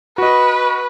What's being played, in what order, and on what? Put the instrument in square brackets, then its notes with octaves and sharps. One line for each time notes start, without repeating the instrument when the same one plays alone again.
[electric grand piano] F#4 D#5 [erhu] B4